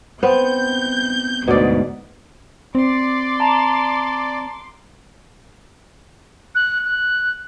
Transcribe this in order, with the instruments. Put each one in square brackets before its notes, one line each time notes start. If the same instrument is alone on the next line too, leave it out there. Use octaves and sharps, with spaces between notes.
[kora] B3 C4 [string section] G6
[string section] D2 G#2 [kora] B2 D5
[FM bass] C4 [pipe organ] D5 [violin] C6 D6
[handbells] A5 A#5
[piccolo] F#6
F#6